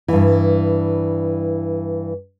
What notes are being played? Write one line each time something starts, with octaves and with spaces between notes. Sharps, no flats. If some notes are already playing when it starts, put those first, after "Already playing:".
G2 E3